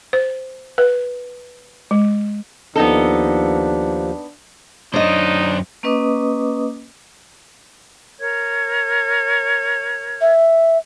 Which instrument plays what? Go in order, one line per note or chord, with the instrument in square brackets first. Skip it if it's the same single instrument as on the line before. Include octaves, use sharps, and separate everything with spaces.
[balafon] C5
B4
G#3
[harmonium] D#2 F3 [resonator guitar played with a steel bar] B3 D#4 A4 [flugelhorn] D4
[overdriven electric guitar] F#2 C5 [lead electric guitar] D4 [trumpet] D#4 [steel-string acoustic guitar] C#5 D#5
[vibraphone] A#3 C#4 B4 D#5 D6 D#6
[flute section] A#4 C#5 G#6
[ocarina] E5